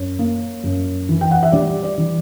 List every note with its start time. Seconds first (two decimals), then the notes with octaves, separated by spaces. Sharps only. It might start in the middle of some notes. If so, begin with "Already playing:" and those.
Already playing: F#2 C#5
0.19 A#3
0.64 F#2
1.09 E3
1.21 G5
1.31 F#5
1.43 E5
1.52 G3 D5
1.83 D5
1.98 E3